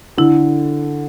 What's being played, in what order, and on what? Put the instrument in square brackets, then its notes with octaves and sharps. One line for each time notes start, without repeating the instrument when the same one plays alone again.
[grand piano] D3 [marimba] E4